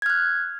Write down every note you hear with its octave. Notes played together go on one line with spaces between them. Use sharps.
F6 F#6 G#6